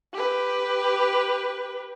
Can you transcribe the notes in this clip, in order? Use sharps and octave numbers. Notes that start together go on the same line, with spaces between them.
G4 B4